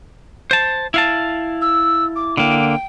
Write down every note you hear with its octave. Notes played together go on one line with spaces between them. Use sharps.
C5 A5
E4 F5 A5
E6
D6
D3 A#3 G5